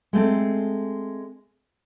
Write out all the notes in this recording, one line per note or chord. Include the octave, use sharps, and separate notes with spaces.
G#3 A3 C4